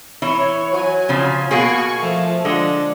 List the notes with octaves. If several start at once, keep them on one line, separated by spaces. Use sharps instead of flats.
E3 E4 C#5
F#3 G#5
C#3 F3
B2 A#3 F#4 G#4 G#5 C#6
F3 A3
D3 G#3